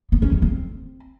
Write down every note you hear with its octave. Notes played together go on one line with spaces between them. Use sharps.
B3
C#4
D#3
C4